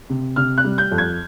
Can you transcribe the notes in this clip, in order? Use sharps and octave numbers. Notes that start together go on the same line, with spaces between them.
C3
C3 F6
F#6
G3
G6
F2
G#6